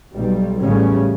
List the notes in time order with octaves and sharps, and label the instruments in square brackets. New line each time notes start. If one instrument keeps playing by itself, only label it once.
[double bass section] B1 G3
A1 E2 A2 C#3 G3 C#4